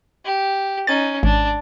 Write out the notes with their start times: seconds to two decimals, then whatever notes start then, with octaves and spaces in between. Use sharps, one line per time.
0.25 G4
0.87 C#4 D#4 A6
1.23 G#1 D4